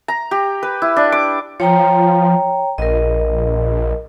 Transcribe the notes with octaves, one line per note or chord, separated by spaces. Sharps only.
A#5
G4
B4
E4
D4
D6
F3 C#5 G5 A#5
A#1 A#4 D#5